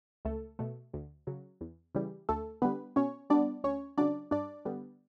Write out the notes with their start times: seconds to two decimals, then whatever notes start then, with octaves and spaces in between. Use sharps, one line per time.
0.25 C#2 A3 A4
0.59 B2 A3
0.94 D2
1.27 C#3 F#3
1.61 E2
1.95 C#3 E3 G3
2.29 D2 A3 A4
2.62 D3 G3 B3 B4
2.96 B2 C#4 C#5
3.30 G3 B3 D4 D5
3.64 D2 C#4 C#5
3.98 C#3 F#3 D4 D5
4.31 G2 D4 D5
4.65 D3 G3 B3